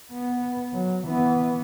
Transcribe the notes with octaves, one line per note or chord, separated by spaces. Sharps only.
B3
F#3
E3 B3